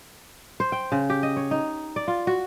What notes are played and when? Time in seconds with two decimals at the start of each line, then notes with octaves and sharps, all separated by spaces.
0.60 C5
0.72 G5
0.92 C#3
1.10 G4
1.23 D#5
1.37 C#5
1.51 D#4
1.96 D5
2.08 F4
2.27 F#4